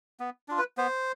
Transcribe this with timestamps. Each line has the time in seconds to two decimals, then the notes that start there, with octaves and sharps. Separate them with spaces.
0.20 B3
0.48 D4 F4
0.58 B4
0.77 B3 C5